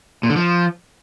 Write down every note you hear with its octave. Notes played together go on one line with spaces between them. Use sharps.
A#2
D3
F3